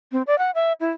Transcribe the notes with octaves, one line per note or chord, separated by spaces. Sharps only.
C4
D5
F#5
E5
E4